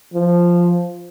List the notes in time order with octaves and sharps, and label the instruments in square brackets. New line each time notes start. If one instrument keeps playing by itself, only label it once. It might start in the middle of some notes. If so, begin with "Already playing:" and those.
[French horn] F3